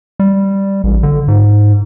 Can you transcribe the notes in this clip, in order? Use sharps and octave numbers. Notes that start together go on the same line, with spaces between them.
G3
A1
D3
G#2